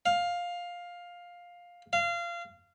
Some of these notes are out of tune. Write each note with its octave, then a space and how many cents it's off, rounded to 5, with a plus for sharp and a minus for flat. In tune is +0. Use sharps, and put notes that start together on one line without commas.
F5 +10
F5 -25